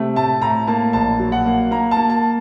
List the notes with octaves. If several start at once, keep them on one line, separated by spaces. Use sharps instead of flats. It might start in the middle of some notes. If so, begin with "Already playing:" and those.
Already playing: C3 A3
A2 A5
A2 A#5
A#3 A5
A#1 A5
F#3
F#5
A#3
A#3 A#5
A5
A#3
A5